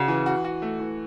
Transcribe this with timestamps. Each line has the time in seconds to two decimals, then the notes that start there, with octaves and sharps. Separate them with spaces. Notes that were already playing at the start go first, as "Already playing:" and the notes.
Already playing: C#3 F#4
0.08 E3
0.26 F#4
0.44 F#4
0.62 A3
0.80 E3